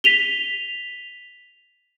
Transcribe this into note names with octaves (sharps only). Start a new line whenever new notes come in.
B6 D#7 F7 G7